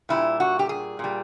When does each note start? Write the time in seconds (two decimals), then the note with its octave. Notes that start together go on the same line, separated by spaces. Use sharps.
0.09 A#2 G3 E4
0.40 F#4
0.59 G4
0.69 G#4
0.99 A#2 G3